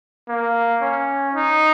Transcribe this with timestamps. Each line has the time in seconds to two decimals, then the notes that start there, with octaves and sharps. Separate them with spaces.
0.29 A#3
0.81 C#4
1.34 D#4